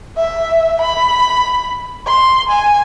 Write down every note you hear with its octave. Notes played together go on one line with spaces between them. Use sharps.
E5
B5
C6
G#5